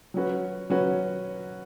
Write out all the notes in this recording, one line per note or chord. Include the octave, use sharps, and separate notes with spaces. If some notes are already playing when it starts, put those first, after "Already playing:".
F#3 C#4 F#4 B4
F#3 C#4 F#4 B4